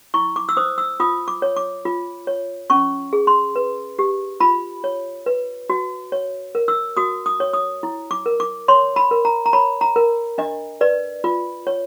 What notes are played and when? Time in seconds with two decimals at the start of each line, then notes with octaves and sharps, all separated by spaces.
0.14 E4 C#6
0.36 D6
0.49 E6
0.57 C5 D#6
0.78 E6
1.00 F4 D#6
1.28 D6
1.42 C#5
1.57 D6
1.85 F4
2.27 C#5
2.70 C#4 C#6
3.13 G#4
3.27 C6
3.56 B4
3.99 G4
4.40 F4 B5
4.84 C#5
5.26 B4
5.70 F#4
6.12 C#5
6.55 A#4
6.68 E6
6.97 F#4 D#6
7.26 D#6
7.40 C#5
7.53 D#6
7.83 E4
8.11 D6
8.26 A#4
8.40 D6
8.68 C#5 C6
8.96 B5
9.11 A#4
9.25 A#5
9.46 A#5
9.53 C#5 B5
9.81 A#5
9.96 A#4
10.38 D4 D#5
10.81 B4 D5
11.24 F4
11.67 C#5